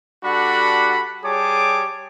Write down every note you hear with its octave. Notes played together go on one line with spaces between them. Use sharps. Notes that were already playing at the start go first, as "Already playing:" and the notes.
G3 D4 F#4 A4 F#5 B5
G3 G4 G#4 C#5 A5 D6